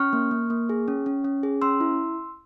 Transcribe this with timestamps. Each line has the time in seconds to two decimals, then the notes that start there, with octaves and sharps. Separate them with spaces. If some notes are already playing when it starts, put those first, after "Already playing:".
Already playing: C#4 C#6 F6
0.13 A#3
0.31 A#3
0.50 A#3
0.69 G#4
0.88 C#4
1.06 C#4
1.25 C#4
1.43 G#4
1.62 C#4 C6 E6
1.80 E4